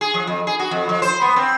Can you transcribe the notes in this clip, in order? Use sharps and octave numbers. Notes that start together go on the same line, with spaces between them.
G#4
F3
F2
G#4
F#4
F2
F3
C5
B3
C4